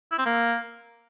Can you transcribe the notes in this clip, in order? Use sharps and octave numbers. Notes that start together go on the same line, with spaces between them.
E4
C4
A#3